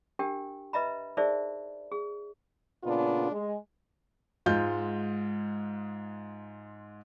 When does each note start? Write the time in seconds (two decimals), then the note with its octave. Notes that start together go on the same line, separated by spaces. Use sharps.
0.19 D4 G4 A#4 G5
0.73 B4 D#5 E5 A#5 B5
1.17 D#4 G#4 A#4 C5 D5 E5
1.92 G#4
2.84 A#2 C#3 B3 D4 F4
3.32 G#3
4.46 G#2 G#3 F4 G6